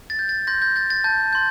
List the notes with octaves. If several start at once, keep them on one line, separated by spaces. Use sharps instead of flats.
A6
G6
A6
C6 G6 A#6
G6 A#6
G6 A6
A6
A5 G6
C6 G6